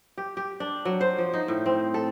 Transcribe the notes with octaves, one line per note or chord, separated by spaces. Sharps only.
G4
G4
D4
F#3
C5
F3
D#4
A2
C4
A4